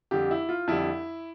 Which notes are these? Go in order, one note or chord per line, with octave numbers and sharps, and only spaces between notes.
F2 D3 G3 G4
E4
F4
F2 D3 G3 E4